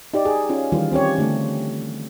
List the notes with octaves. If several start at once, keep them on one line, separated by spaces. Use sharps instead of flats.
D#4 G4 D5
G#4
C#4 D#4 F4
D#3 E3 G3 F4
C4 C#4 G4 C#5
D3 A3